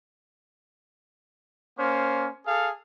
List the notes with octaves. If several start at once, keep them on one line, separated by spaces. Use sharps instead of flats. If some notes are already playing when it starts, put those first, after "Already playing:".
A#3 C#4 C5
G#4 A4 F5